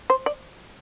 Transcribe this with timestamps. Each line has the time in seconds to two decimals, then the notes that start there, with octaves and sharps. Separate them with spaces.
0.10 C5
0.26 D5